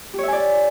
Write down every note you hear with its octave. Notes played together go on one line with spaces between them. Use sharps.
G4 C#5 D5 E5 G#5